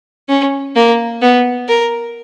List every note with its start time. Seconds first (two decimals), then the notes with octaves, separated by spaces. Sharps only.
0.29 C#4
0.76 A#3
1.22 B3
1.68 A#4